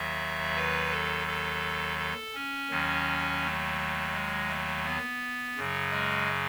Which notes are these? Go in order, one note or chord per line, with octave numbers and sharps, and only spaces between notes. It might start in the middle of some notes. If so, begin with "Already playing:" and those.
Already playing: D#2 D#3 F#3 E5
B4
A4
A4
A4
C#4
D#2 D#3 F#3
A3
G#3
A3
B3
F#2 C#3 F#3
G#3